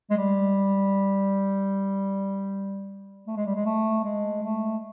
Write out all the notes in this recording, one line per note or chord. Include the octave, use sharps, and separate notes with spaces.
G#3
G3
A3
G#3
G3
G#3
A3
G#3
A3